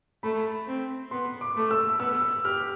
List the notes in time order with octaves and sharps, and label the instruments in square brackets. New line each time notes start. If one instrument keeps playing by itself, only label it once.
[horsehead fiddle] A3 [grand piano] B5
[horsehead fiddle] C4
[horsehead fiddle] B3 [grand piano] C6
[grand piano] D6
[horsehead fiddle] A3
[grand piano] E6
[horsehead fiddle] B3 [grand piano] E6
[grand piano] E6
[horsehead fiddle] G4 [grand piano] F6